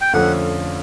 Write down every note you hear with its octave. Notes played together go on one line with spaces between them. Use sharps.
G5
F2 D3 F3 A3 C#4 F#5